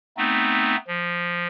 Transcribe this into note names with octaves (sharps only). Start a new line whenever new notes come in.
A3 B3 C4 D#4
F3